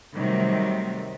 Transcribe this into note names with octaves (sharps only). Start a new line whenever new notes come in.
C3 D#3 F#3 G3 A3